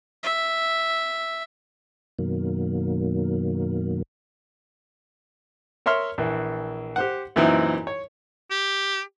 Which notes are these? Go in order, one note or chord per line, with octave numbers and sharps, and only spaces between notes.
E5
F#2 B2 D#3 F#3 A#3
A#4 C#5 E5 C6 F6
A#1 E3
G4 C5 F#5
F#2 A#2 E3 C4 D#4 E4
C#5
G4